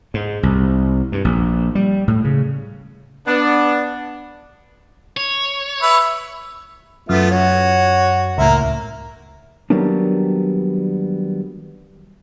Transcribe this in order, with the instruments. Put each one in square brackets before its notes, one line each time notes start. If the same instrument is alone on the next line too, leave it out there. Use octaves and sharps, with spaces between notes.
[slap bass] G#2
C2
G2
A#1
G3
A2
C#3
[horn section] B3 D4
[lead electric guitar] C#5
[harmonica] B4 E5
[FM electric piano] F#2 [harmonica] A3 B3 F4
[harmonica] F#4 C#5
[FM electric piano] C#2 A2 [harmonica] A#3 E5
[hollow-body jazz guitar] D#3 F#3 G3 A#3 B3 D4